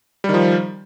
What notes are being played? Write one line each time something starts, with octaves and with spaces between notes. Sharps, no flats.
D#3 F3 G3